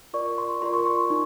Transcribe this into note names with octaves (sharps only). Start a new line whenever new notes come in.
F4 A#4 D5 C#6
C6
F4 A#4 D5 C6
C#6
C6
D#4